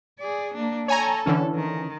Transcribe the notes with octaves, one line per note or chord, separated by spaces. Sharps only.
G#4 D5
A#3 D4
A4 C#5 G#5 A#5
D3 E3 C#4
D#3